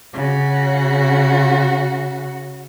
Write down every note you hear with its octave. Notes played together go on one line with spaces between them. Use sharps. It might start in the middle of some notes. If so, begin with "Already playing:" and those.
C#3 F#4